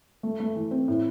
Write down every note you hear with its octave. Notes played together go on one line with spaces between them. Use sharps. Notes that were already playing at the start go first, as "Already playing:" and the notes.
A3
A3
E3
C4
A2